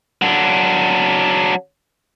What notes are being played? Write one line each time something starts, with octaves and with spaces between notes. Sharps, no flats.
F#3 D4